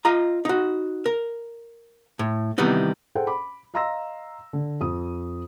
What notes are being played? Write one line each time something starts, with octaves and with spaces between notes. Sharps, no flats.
F4 D#5 A#5
D#4 F#4
A#4
A2
C3 D#3 E3 G3 B3 D#4
G#4 A4 C5 F#5 G5
B5 D6
D#5 F5 A#5 C6 E6 A#6
D3
F2 D#6